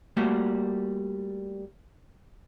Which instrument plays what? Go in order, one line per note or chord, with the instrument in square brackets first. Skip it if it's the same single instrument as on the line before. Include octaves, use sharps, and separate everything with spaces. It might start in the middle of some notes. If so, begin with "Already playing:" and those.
[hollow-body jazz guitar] G3 A3 A#3 F#4